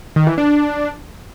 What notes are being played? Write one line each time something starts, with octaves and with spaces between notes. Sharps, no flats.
D#3
E3
D4